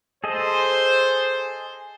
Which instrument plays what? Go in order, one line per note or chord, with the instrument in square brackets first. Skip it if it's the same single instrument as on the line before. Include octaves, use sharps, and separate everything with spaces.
[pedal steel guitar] G#4 A4 D#5 [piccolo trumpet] C5